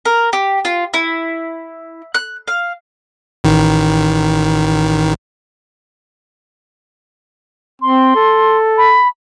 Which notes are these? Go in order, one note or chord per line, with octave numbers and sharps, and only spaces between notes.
A#4
G4
F4
E4
F#6
F5
A1 D#3
C4 C6
A4
B5